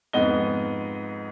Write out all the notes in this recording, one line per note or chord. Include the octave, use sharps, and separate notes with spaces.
F2 G#2 B3 D#5 G7